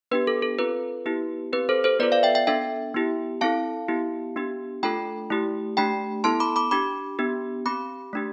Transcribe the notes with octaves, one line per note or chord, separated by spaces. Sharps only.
B3 D4 G4 B4
A4
A4
C4 F4 A4 B4
B3 E4 G4
C4 G4 B4
A4 C5
A4 C5
B3 F4 A4 B4 D5
D5 F5
E5 G5
E5 G5
B3 D4 A4 E5 G5
B3 E4 G4
C4 E4 A4 F5 A5
B3 E4 G4
B3 D4 G4
A3 D4 F4 A4 G5 B5
A3 E4 G4
A3 D4 G4 G5 B5
B3 E4 A4 A5 C6
B5 D6
B5 D6
D4 G4 B5 D6
B3 D4 G4
C4 G4 B5 D6
A3 D4 G4